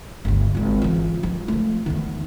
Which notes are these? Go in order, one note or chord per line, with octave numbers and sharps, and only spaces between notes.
G1 D2
G#1 A#2
E3 F4
F3
F3 A3
E2 D#3